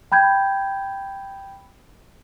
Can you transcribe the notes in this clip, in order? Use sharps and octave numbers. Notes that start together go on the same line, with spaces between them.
G5 B5 G6 G#6